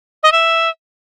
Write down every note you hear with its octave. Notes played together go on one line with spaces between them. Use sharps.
D#5
E5